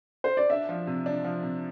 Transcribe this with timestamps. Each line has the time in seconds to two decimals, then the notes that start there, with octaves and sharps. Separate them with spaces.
0.24 C5
0.37 D5
0.50 D4 E5
0.69 F3
0.87 C3
1.06 D4
1.24 F3
1.43 C3